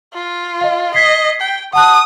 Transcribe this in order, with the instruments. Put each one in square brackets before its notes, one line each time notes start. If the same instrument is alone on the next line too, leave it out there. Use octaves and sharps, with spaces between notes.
[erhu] F4
[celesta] D#5 F5
[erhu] D#5 [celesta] G#6 B6 C7
[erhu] G5
[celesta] F#5 A5 F#6 [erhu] D#6